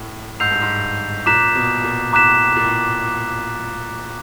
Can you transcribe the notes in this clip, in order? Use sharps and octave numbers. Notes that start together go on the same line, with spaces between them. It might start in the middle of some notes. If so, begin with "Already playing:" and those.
Already playing: A2
G#2 E6 G6 C7 F7
G2
G#2
A#2 A#5 D6 F#6 B6 E7
B2
A#2
A2 A#5 D6 F#6 B6 E7
A#2
A2